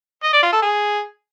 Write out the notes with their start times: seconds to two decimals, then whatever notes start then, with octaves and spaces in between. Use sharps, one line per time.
0.23 D#5
0.33 D5
0.43 F4
0.52 A4
0.62 G#4